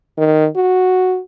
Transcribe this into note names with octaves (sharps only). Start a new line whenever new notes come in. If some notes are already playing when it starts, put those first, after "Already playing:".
D#3
F#4